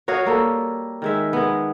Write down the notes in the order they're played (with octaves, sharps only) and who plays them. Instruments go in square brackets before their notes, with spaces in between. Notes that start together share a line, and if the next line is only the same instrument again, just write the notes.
[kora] F#4 C#5 D#5 F5
G3 A#3 A4
D#3 G#3 E5
G#3 B3